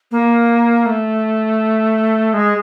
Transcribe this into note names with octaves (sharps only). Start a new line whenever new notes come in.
A#3
A3
G#3